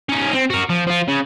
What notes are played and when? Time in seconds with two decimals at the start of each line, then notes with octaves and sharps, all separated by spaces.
0.09 C#4 D#4
0.33 C4
0.50 F#4 A#4
0.69 F3
0.87 F3 F4
1.08 C#3